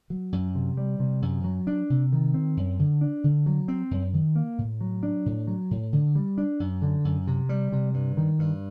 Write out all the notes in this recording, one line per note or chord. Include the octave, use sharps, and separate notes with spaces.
F#3
F#2
C3
G3
C3
F#2
F#3
D4
C3
D#3
C4
F#2
D3
D4
D3
F#3
C4
F#2
D#3
A#3
A2
F#3
D4
A2
F#3
A2
D3
G3
D4
F#2
D3
F#2
C3
G3
C3
G2
D#3
G2